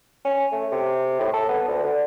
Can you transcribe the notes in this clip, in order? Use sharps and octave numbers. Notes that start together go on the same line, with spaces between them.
C#4
A3
C3
A2
A4
B3
D2
D3